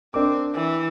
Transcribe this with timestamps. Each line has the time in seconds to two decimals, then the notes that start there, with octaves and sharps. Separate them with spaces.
0.14 C4 D4 A#4 D6
0.55 E3